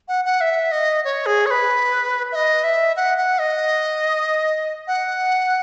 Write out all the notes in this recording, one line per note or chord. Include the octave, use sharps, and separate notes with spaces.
F#5
F#5
E5
D#5
C#5
G#4
C#5
B4
E5
D#5
E5
F#5
F#5
D#5
F#5